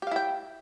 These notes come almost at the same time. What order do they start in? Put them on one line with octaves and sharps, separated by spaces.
G4 F5 E4 G5